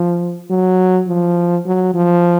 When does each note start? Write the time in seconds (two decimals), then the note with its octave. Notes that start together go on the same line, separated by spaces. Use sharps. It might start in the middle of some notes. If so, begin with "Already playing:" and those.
Already playing: F3
0.50 F#3
1.08 F3
1.66 F#3
1.94 F3